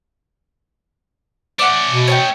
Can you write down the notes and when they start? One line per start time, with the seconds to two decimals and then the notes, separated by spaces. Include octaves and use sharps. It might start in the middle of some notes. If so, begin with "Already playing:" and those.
1.59 A3 C#4 D5 F#5
1.88 B2
2.07 C#5 D#5 G5